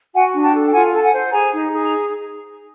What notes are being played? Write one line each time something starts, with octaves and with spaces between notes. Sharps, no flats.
F#4 F#5 G#5
D4
G5 A5
A4
G5
F4 F#5 G#5
A4 A5
F#5 G#5
C5
G#4 G#5 A#5
D#4
G#4
A#5